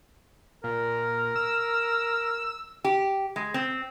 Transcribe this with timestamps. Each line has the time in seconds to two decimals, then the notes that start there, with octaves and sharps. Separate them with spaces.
0.64 A#2 A#4
1.36 E6
2.84 G4
3.36 G#3
3.54 C4